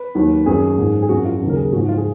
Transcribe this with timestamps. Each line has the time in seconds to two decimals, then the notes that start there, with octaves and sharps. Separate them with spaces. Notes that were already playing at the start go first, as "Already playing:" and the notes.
Already playing: B4
0.15 D#2 D#3 F#3
0.46 F#2 D#3 F#3 G#4
0.78 G#2 F3
1.02 G#4
1.09 F#2 F3 F#4
1.25 F4
1.41 D#2 C#3 F#3
1.49 A#4
1.57 G#4
1.72 G#2 F3 F#4
1.88 F4
1.97 G#4